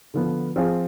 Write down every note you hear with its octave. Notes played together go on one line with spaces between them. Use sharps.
D3 F3 B3
F3 C4 F4 G#4